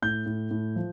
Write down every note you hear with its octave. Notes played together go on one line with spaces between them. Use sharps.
A2 G6
A2
A2
F3